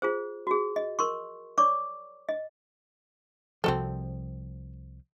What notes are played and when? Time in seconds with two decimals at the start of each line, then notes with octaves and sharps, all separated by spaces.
0.02 F4 G#4 C5
0.47 F#4 G#4
0.76 D#5
0.99 A#4 C6 C#6
1.58 C#5 D5 C#6 D6
2.29 D#5
3.64 C2 F3 C4 F#4 A4